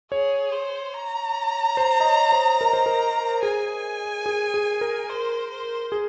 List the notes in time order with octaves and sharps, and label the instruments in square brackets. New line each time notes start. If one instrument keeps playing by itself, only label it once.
[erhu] G#4 [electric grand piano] C#5
[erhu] C5
A#5
[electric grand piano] C5
D#5
C#5
C5
A#4
C5
A#4
[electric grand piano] G#4 [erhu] G#5
[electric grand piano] G#4
G#4
A#4
[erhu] C5
C5
[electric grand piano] G#4